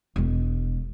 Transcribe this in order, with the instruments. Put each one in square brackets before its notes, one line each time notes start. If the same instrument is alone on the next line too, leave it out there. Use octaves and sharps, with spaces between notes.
[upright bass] E1 G#3